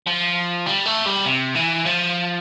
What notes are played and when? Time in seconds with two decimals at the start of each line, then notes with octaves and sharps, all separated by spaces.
0.07 F3
0.66 G3
0.86 A3
1.07 G3
1.26 C3
1.56 E3
1.86 F3